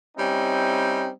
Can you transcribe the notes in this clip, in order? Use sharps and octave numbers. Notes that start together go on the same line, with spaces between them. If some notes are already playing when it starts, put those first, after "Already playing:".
G3 C4 C#4 D#4 E4